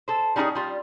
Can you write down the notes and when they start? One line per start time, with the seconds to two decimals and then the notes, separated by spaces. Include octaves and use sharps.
0.08 A4 C5
0.36 G3 C#4 D#4 F4 G#4
0.55 G3 F4